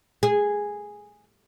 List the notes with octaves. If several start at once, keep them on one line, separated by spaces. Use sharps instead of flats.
G#4